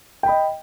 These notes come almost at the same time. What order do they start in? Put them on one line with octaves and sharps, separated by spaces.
G5 B5 D#5